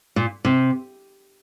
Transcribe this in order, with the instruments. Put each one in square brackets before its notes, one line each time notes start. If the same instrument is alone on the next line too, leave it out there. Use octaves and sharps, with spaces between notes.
[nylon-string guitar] A#2
C3